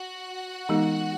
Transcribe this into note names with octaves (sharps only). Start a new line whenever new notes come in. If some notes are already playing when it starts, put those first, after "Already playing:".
Already playing: F#4 F#5
E3 G#3 B3 D#4 G4